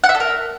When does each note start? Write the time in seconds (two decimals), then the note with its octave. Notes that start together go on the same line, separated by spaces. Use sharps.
0.04 F#5
0.09 E5
0.15 A4
0.20 A#4